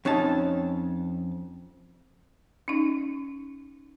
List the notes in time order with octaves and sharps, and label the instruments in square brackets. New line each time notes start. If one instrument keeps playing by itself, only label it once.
[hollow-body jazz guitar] F2 C#4 D#4 A5
[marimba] C#4 D#4